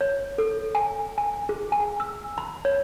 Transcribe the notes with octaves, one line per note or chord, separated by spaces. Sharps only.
C#5
A4
G#5
G#5
G#4
G#5
E6
B5
C#5